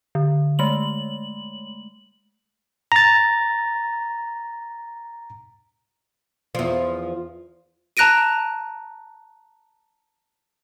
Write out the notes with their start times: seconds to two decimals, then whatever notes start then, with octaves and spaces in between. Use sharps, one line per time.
0.15 D3
0.59 G#3 A3 F#7
2.92 A#5 A6
6.55 E2 F3
7.97 A5 A#5 F#6 A#6 D7 D#7